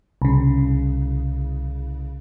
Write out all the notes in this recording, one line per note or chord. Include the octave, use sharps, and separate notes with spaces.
C2 C#3